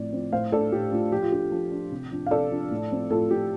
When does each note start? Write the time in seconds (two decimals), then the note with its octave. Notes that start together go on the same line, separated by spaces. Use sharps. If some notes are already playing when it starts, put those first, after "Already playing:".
Already playing: A2 F3 C4 D5
0.13 F3 C4
0.32 A2 C5 F5
0.52 A3 D4 A4 D5
0.72 A2 G4
0.92 A3 D4 F4
1.12 F3 G4
1.22 F4
1.32 D4 G4
1.52 F3
1.72 D4
1.92 C3
2.11 F3 D4
2.26 F5
2.31 C3 A4 D5
2.51 F3 D4
2.71 A2
2.91 F3 C4
3.10 A2 F4 A4
3.30 F3 C4 G4